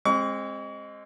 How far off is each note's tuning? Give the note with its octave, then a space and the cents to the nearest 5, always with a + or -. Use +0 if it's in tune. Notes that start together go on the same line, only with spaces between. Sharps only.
G#3 -10 C4 +25 C#6 +40